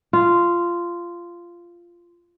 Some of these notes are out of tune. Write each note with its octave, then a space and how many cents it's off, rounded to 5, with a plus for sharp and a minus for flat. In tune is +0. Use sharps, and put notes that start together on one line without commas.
F4 -10